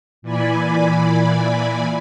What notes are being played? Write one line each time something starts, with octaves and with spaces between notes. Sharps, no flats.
A#2 E3 D5 G#5 B5